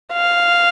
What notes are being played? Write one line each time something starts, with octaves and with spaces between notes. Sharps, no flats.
F5